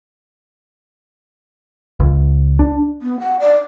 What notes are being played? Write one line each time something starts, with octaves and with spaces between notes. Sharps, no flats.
C#2
D4
B3
F#5
D5